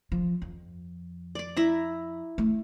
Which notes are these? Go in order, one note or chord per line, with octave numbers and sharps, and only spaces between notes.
F3
F2
D5 D6
E4 E5 A#5
A3